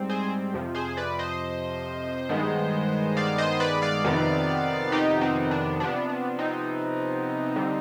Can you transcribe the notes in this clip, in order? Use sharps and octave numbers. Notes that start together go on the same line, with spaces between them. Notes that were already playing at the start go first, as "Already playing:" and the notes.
Already playing: G#2 G3 C4
G#4 C5
F2 C3 F3
G#4 C5
B4 D5
C5 D#5
G2 D#3 G#3 B3
D5 F5
C5 D#5
B4 D5
D5 F5
F2 C3 D#3 B3
D#4 G4
C4 D#4
D4
C3 F3 B3 D4
D4
C4 D#4
D3 G3 C4